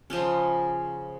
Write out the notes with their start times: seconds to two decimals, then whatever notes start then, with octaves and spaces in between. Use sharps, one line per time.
0.10 C#3 F3 G#3 C#4